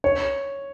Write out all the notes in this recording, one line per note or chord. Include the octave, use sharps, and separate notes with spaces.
C#5